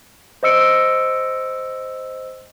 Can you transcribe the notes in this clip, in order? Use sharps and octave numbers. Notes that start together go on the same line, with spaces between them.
C5 D#5 E6 C#7 D7